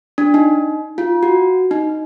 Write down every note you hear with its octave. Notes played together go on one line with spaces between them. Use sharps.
D4
D#4
F4
F#4
D#4